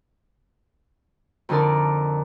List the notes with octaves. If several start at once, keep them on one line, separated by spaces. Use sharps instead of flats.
F2 D3 D#4 A#4 D5